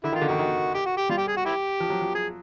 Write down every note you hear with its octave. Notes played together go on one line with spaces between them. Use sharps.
D3 E4
D#3
F4
D3
D#3 F#4
D#3
G4
F#4
G4
G3 F4
G4
G#4
F#4
E4 G4
F3
F#3
F3
G#4